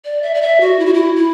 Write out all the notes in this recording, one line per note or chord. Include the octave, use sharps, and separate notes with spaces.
D5
E5
D5
E5
F#4
E4
F#4
E4
E4